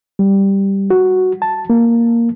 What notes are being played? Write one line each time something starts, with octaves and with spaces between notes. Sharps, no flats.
G3
F#4
A5
A#3